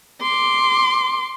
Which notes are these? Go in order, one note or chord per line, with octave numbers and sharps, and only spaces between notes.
C6 D6